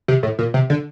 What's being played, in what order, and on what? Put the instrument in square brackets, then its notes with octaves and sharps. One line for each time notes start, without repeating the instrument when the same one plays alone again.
[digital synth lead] C3
A2
A#2
C3
D3